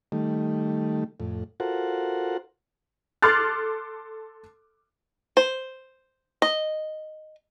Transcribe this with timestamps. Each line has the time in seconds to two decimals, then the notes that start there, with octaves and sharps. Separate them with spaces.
0.12 D#3 G3 A3
1.20 F2 A2
1.60 F4 F#4 A4 A#4 C5 F#5
3.22 A4 C6 D6 F6 F#6 A6
5.37 C5
6.42 D#5